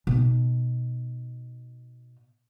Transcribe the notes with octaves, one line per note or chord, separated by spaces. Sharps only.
B2 D#4